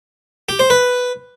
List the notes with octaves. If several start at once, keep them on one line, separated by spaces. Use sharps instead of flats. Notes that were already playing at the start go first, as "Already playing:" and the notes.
G4
C5
B4